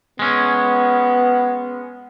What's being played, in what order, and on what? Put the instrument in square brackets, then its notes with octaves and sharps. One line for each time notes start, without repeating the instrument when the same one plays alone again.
[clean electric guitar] G#3 C#4 [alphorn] B3